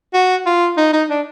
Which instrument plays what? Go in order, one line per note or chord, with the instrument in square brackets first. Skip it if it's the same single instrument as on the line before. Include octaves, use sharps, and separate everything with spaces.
[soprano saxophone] F#4
F4
D#4
D#4
D4